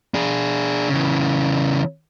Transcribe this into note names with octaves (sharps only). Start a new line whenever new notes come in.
D4 G#4
C#3 E3